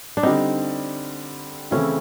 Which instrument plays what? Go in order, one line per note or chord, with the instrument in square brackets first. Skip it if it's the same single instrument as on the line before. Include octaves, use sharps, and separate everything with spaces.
[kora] D4
[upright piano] D3 G3 C4 [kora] D#4
[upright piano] C#3 E3 A3 C4 E4 [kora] C#4